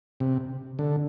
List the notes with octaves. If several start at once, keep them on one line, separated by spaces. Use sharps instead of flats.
C3
D3